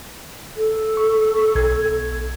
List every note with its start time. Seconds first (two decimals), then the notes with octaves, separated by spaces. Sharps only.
0.57 A4
0.97 C#6
1.55 B1 G#6